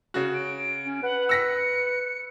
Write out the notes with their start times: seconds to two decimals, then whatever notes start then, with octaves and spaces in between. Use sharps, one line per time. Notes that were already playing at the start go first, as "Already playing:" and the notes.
0.14 C#3 F#4
0.34 D7
0.85 C#4
1.03 B4 F#5
1.29 E6 A#6 B6 C#7